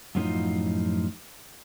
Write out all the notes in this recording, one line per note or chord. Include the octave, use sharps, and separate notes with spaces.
F#2 A2 F3 A3 D#4 F4